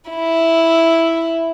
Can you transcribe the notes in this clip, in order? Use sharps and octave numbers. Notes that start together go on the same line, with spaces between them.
E4